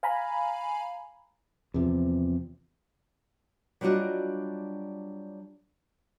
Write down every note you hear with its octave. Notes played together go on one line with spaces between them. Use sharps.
F5 G#5 A#5 B5
E2 C3 F3
F#3 G3 D4 F4 F#4 D#5